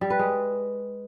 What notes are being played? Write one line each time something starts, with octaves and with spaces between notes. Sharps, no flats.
G3
B4
G#3